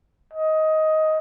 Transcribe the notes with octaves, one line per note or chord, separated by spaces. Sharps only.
D#5